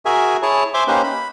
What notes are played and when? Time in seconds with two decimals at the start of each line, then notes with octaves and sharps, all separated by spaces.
0.05 F#4 G#4 A#4 E5 G#5
0.42 E4 G#4 C#5 A5
0.74 C5 E5 G#5 C6 D6
0.87 A#3 C#4 D#4 G4 B4 C5
1.04 B5